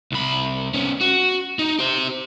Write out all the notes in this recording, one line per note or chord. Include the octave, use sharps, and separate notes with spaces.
C2 B5
B3 C#4
F#4
D#4
G4 C5